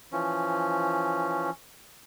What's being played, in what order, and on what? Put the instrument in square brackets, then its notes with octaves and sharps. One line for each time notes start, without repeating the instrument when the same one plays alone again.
[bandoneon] E3 F3 C#4